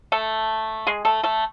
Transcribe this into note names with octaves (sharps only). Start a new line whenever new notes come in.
A3 A4
G#3 G#4
A3 A4
A3 A4